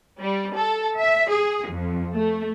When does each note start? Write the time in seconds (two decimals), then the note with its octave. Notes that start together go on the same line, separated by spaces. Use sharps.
0.21 G3
0.55 A4
0.99 E5
1.30 G#4
1.69 F2
2.15 A3